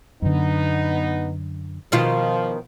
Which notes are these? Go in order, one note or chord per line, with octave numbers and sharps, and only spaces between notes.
F#2 D3 B3 D#4
B2 D#3 F3 F4